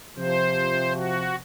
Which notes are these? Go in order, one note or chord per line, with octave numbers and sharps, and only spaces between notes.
C3 F3 C5
F#4